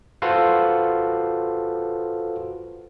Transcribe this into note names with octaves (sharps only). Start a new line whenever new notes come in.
F4 F#4 A4 B4 C5 F5